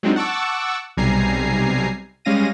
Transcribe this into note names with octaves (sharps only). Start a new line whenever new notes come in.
F#3 G#3 C4 D4 D#4 F4
F#5 A5 C#6 D6 E6
B1 C3 G3 G#5 A#5 C7
G3 G#3 C#4 F5 A#6 D#7